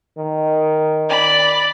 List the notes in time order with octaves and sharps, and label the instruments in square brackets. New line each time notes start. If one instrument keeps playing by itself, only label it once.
[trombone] D#3
[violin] D5 B5